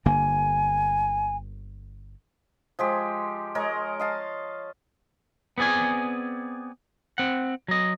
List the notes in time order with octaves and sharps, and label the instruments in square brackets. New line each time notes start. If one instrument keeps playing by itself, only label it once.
[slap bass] G1 D3 A#3 [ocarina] G#5
[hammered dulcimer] F3 G#3 G4
G#3 A#4 C#5 D#5
D#5 F5 A5
[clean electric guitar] B3 C4 G#4 D5 G#5
C4 F#5
F#3 D#5